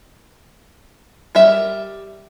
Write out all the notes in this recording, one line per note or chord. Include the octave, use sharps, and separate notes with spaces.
G3 A#4 E5